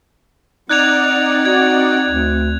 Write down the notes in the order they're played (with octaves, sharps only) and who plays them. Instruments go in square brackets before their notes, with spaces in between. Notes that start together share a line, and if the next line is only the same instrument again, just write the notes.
[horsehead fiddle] C4 [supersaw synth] D#4 D5 F#5 [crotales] F#6 G#6 F7
[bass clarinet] F#4 [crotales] G#6
[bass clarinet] D2